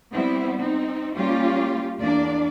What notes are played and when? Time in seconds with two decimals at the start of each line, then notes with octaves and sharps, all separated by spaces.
0.13 G3 B3 C4 E4
0.60 C4 D#4
1.17 G3 A#3 C#4 F4 G4
2.00 E2 A#3 D4 D5